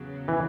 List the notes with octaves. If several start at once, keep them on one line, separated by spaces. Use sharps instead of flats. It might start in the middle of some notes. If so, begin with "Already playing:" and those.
Already playing: E2 C#3 F#3 B3
E3